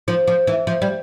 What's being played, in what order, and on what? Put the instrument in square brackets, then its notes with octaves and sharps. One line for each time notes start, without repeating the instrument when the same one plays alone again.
[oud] F3
F3
E3
F3
G3